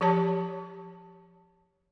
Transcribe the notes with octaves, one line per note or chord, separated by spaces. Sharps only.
F3 G4 C#5 A5